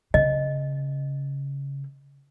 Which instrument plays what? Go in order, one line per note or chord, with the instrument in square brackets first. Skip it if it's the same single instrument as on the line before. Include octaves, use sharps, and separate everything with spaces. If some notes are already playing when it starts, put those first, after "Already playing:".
[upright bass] C#3 [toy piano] D#5